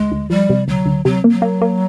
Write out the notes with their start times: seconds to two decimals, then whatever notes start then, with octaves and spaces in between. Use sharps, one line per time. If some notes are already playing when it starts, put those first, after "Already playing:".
Already playing: D2 G#3
0.12 D2
0.30 F3 G3
0.50 C3
0.68 D2 F#3
0.86 D2
1.05 C3 F#3
1.24 A#3
1.32 F#3
1.42 A#3
1.61 A#3